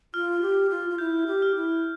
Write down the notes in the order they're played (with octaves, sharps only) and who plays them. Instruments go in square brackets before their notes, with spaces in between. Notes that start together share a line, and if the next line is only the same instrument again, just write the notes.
[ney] F4 [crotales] F6
[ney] G4
F4
F4
[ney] E4 [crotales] G6
[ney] G4
[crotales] F6
[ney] E4